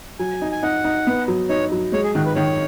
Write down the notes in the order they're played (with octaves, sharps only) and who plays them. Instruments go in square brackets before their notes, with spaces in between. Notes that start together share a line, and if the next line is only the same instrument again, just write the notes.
[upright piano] F#3 [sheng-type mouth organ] G#5
[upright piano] D#4
[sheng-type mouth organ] G#5
[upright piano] D#4 [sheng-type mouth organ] F#5
[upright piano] D#4
B3
F#3
[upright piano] D#4 [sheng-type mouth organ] C#5
[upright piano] F#3
[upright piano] G#3 [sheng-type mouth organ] C#5
[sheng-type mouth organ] G#4
[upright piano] D#3 [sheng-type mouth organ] F#4
[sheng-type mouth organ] B4
[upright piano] D#3 [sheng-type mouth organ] C#5